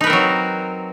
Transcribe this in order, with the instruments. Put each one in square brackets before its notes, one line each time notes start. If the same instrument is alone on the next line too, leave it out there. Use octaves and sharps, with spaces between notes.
[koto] D#4
B4
A#4
C4
F#3